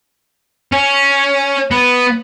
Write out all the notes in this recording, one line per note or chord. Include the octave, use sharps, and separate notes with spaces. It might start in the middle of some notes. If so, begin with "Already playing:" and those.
C#4
B3